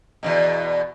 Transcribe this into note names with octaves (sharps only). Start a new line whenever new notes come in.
E2 G#2 B2